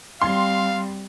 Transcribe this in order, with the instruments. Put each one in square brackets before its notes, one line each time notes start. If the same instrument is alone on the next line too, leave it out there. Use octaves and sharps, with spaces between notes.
[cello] G3 C4 [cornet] F5 [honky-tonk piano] C6